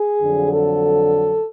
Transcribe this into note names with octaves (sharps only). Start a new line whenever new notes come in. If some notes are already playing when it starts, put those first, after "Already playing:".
Already playing: G#4
F2 D3 F#3
A4